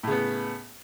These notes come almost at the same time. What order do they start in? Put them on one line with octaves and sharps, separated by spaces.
A2 C#3 B3